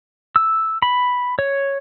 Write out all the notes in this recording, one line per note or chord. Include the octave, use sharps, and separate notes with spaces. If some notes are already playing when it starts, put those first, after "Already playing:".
E6
B5
C#5